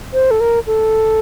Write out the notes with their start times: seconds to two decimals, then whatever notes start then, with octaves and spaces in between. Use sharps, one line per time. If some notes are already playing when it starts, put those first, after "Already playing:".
0.14 C5
0.31 A4
0.41 A#4
0.67 A4